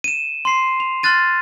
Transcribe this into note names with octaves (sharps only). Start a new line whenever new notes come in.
D#7 E7
C6 C7
F7
C6 F6 F#6 A6 D#7